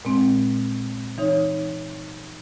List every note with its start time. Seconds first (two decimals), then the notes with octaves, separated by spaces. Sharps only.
0.05 A#2 G#3 C4
1.18 E3 D#4 C#5